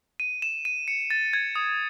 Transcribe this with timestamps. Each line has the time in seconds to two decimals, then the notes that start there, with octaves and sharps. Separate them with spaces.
0.20 D#7
0.42 E7
0.65 D#7
0.88 C#7
1.10 A6
1.33 G#6
1.56 D#6